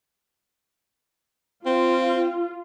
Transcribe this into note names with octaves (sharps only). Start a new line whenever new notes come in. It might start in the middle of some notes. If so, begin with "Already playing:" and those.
C4 F4